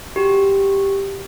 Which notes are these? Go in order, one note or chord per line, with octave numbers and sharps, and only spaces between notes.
F#4 G4